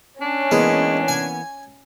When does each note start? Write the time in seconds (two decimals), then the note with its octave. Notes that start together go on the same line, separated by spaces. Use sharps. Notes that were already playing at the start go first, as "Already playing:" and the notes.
0.21 C#4 D4
0.51 E3 G#3 A#3 B3
1.08 G#5